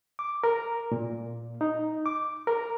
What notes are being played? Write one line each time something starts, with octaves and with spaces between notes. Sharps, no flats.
D6
A#4
A#2
D#4
D6
A#4